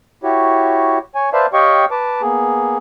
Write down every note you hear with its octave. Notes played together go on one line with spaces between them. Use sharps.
E4 F#4 G4 C#5
C#5 G#5
B4 C5 D5 E5 F5 A5
G4 C#5 D#5 F5 G5 C#6
B4 A5 D6
A#3 B3 G#4